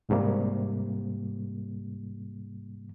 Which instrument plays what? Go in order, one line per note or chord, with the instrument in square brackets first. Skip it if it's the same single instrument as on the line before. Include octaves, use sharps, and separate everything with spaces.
[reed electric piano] C2 G#2 C3 G3 A#3